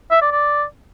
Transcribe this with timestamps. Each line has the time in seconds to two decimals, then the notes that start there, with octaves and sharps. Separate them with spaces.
0.11 E5
0.22 D5
0.32 D5